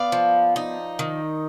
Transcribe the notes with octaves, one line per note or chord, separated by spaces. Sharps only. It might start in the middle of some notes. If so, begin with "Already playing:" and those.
Already playing: B3 D5 F5
F3
D#4
D#3